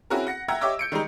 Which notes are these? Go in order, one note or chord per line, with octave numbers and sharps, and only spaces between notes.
C4 C#4 E4 F#4 G#4 A#4
F#5 A#6 C#7
E5 F#5 G5 A#5 E6 G#6
G4 C#5 D#5 E5 D6 E6
G6 C#7 D7
D#3 G3 G#3 D#4